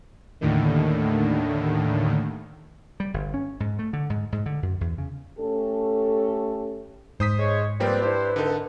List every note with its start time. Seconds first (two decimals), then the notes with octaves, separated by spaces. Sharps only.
0.41 D#2 A2 D3 D#3
3.00 G3
3.14 G1
3.34 C#4
3.60 G#2
3.79 A3
3.93 D3
4.10 G#2
4.32 G#2
4.46 D3
4.63 F#2
4.81 E2
4.98 C#3
5.39 A3 C#4 G4 A4
7.20 G#2 C5 D#6 B6
7.39 G#3 C#5
7.80 F3 G3 A#3 C4 B4 D5
8.02 D4 E4 G4 C5
8.36 C2 D3 D#4 A4